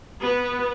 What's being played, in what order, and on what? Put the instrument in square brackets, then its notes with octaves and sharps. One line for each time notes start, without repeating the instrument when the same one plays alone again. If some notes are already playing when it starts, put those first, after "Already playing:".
[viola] B3